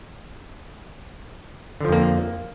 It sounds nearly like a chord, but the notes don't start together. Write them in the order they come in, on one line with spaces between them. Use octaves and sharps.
D3 F3 F2 A#3